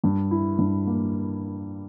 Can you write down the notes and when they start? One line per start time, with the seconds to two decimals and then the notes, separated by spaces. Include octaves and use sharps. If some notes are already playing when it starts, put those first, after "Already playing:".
0.04 G2
0.31 E4
0.59 G2
0.87 A#3